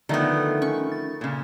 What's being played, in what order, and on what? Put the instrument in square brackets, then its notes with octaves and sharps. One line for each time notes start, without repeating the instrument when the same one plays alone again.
[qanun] D3 B3 [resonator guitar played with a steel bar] D#3 F3 A3 [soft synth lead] D#5
[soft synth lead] C#4 [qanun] C#6
[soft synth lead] A6
[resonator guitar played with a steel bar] A#2 C#3